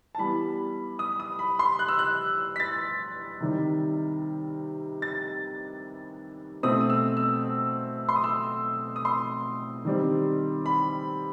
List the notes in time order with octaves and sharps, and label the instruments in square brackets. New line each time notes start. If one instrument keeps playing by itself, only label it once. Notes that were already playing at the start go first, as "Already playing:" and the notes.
[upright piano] A5
E3 G3 B3 B5
D#6
D#6
B5
C6
F#6
E6
F#6
B6
A6
C3 D#3 G3
A6
B2 A3 C4 D#6
D#6
E6
E6
C6
D#6
E6
D#6
C6
D#3 G3 C4
B5